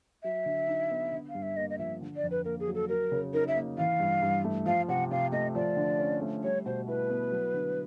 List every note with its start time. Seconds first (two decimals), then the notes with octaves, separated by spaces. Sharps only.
0.23 F#3 E5
0.46 D3
0.68 D#4
0.90 B3
1.12 D3
1.29 F5
1.35 G2
1.43 E5
1.57 A#3 D#5
1.70 D#5
1.78 F3 E5
2.01 D3
2.16 D5
2.23 F2
2.31 B4
2.45 A#3 A#4
2.60 G#4
2.68 F#3
2.75 A4
2.89 F#3 A#4
3.12 C#3
3.34 D#4 A#4
3.48 E5
3.55 A#3
3.78 E3 F5
4.00 G2
4.22 G2
4.44 A3
4.66 F3 F5
4.88 C3 F#5
5.11 C3 F5
5.32 A3 D#5
5.55 F3 D5
5.77 D3
5.99 C#4
6.21 A3
6.43 G3 C#5
6.66 B2 C5
6.87 E4 B4
7.10 B3
7.31 F#3
7.54 D3